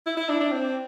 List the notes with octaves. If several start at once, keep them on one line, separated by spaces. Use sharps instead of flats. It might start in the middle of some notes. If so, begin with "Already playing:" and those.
E4
E4
D4
D4
C4